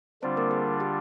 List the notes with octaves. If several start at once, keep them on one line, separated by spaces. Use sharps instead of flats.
D3 G3 C4 D4 F4 C5
A#3 A#4
G#4
G4